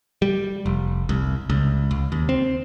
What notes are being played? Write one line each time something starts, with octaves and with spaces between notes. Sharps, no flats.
G3
F1
C2
C#2
C#2
D#2
C4